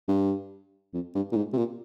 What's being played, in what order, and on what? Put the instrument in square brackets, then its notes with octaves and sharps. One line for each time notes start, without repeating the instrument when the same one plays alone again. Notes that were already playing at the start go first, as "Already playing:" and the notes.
[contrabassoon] G2
F2
G2
A#2
G#2
C3
A#2